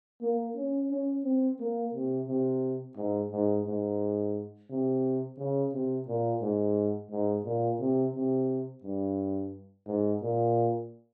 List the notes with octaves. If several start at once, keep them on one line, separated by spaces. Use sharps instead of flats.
A#3
C#4
C#4
C4
A#3
C3
C3
G#2
G#2
G#2
C3
C#3
C3
A#2
G#2
G#2
A#2
C3
C3
G2
G#2
A#2